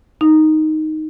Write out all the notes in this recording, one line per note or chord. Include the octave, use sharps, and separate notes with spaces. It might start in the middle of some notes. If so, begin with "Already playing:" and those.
D#4